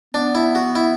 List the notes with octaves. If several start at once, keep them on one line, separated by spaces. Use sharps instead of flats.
B3 D4
E4
F#4
E4